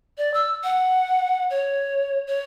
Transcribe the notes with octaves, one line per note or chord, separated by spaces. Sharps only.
D5
E6
F#5
C#5
C#5